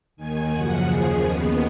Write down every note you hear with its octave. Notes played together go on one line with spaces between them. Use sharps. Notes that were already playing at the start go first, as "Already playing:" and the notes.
D#2 D#3 G#5
F#2 C#3 F3 F#5
D#2 C#3 F3 G#4
D#2 D#3 B3